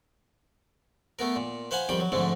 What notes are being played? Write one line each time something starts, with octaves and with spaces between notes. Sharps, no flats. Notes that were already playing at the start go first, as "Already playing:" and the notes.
A3 B3 A#4
A#2
B4 C5 F5 F#5 G#5
F2 D#3 G3 G5 B5
F#3
F2 G#2 D3 G#3 A3